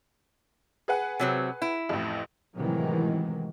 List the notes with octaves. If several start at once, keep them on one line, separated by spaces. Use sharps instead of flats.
G#4 B4 F#5
C3 F#3 C4
E4
A1 F2
A2 C3 D#3 E3 F#3 G#3